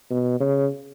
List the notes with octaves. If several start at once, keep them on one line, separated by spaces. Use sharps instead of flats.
B2
C#3